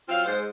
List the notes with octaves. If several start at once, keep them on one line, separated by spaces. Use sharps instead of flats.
F#3 C4 F4 F5
G#2 C5